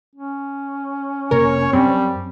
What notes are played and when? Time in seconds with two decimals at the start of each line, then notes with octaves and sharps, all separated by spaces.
0.15 C#4
1.31 F1 C3 A#3 A#4 C#5
1.73 F#2 G3 C4